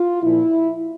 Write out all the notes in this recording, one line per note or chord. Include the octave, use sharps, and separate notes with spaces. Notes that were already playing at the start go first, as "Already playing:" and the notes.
Already playing: F4
A#2 F3 E4